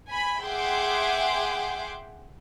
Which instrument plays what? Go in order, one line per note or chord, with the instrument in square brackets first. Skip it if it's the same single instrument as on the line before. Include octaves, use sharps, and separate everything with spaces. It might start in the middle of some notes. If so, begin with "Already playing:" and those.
[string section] G#5 B5
G#4 E5 F#5 G5 C6 D6